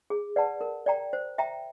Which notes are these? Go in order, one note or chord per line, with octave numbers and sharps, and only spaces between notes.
G#4
B4 D5 F#5 A5
A#4
D5 G5 A#5
C5
E5 G5 A#5